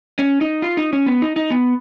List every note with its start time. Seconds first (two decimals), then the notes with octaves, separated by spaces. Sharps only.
0.19 C#4
0.41 D#4
0.62 F4
0.77 D#4
0.93 C#4
1.06 B3
1.22 D#4
1.36 D#4
1.50 B3